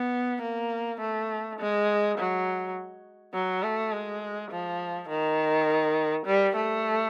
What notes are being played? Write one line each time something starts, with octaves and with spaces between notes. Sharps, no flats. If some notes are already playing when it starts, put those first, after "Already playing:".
Already playing: B3
A#3
A3
G#3
F#3
F#3
A3
G#3
F3
D#3
G3
A3